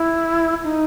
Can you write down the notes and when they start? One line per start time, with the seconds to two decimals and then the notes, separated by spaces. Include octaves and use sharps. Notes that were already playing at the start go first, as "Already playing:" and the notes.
Already playing: E4
0.64 D#4